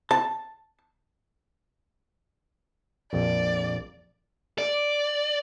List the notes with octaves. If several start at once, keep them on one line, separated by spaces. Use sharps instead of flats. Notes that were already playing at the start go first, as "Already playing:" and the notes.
A5
A#1 F2 D5
D5